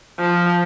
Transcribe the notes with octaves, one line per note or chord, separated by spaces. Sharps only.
F3